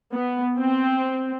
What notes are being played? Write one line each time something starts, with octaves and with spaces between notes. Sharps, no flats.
B3
C4